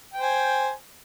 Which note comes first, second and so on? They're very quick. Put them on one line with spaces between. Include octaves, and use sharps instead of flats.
G5 C5 G#5